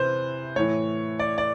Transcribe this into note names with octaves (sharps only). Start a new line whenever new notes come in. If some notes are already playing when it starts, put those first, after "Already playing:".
Already playing: C3 E3 B4 C5
A2 E3 C#5
D5
D5